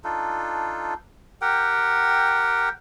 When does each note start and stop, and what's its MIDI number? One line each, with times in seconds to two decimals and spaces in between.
0.04 0.94 62
0.04 0.94 63
0.04 0.94 65
0.04 0.94 69
1.41 2.69 67
1.41 2.69 70
1.41 2.69 78
1.41 2.69 79